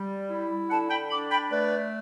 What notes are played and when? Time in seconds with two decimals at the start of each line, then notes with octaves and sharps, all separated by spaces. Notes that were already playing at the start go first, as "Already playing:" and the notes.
Already playing: G3
0.30 E4
0.70 D3 F#5 A5
0.91 G5 B5
1.10 D4 B5 D6
1.31 G5 B5
1.51 A3 B4 D5